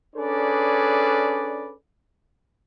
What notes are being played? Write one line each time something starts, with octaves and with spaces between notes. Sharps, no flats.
C#4 D4 G#4 A4 B4 D5